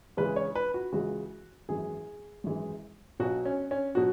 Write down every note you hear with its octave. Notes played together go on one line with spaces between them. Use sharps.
C#2 C#3 E3 G#3 B4
C#5
B4
F#4
C#2 C#3 E3 G#3 F#4
G#1 F#2 E3 G#3 G#4
G#1 F#2 E3 G#3
B1 B2 F#3 F#4
C#4
C#4
B2 F#3 F#4